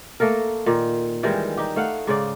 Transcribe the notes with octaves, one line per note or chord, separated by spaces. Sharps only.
A3 A#3 A4 A#4
A#2 D#3
D#3 E3 G3 G#3
D#4 G4
A3 F5 F#5
G#2 C#3 D5